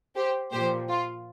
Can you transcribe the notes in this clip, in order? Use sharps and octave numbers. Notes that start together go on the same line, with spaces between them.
G4 C5
A#2 F3 G4 C5
F4